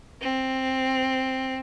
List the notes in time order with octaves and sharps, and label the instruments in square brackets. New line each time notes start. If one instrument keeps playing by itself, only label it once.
[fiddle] C4